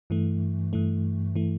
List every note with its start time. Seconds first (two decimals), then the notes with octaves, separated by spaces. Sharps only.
0.10 G2 E3 A3
0.73 G2 E3 A3
1.35 E3 A3